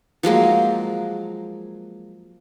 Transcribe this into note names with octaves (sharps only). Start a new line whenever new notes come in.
F3 F#3 G#3 A#3